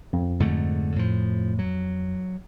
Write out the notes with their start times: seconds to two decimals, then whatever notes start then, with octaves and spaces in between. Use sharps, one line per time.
0.13 F2
0.40 G#2 D3 A3
0.96 A2 F3
1.59 F#3